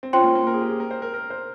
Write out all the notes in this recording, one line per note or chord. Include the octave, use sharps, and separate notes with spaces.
C4
C#4 F4 C5 G5 C6
A#3
A#3
A#4
G#4
G4
G#4
A#4
C5
A#4
A#4
C5